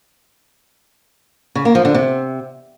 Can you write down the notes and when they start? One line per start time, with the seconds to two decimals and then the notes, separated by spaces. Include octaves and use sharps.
1.55 C#3
1.65 A#3
1.75 F3
1.85 D3
1.95 C3